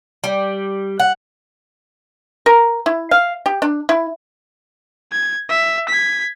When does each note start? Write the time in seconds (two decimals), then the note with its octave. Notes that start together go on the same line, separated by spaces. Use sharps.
0.24 G3
0.99 F#5
2.46 A#4
2.86 E4
3.11 F5
3.46 G4
3.62 D4
3.89 E4
5.12 G#6
5.49 E5
5.89 G#6 B6